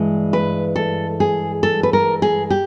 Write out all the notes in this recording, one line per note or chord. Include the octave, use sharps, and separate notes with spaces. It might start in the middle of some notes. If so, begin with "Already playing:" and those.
Already playing: G2 E3 G#3
B4
A4
G#4
A4
B4
A#4
G#4
G4